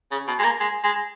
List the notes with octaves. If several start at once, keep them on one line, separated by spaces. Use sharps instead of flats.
C#3
B2
G#3
A#3
G#3
G#3